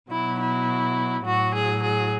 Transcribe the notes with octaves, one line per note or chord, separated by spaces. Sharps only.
B2 F#3 E4
E4
A2 F#3 F#4
G#4
G#4